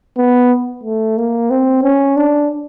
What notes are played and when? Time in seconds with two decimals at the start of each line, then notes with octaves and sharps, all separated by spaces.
0.18 B3
0.83 A3
1.17 A#3
1.50 C4
1.83 C#4
2.17 D4